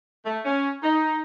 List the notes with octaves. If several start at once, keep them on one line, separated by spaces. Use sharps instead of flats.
A3
C#4
D#4